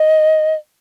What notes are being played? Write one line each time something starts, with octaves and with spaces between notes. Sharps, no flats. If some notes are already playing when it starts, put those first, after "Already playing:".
Already playing: D#5